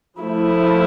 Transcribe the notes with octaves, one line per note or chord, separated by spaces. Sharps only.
F3 A3 E4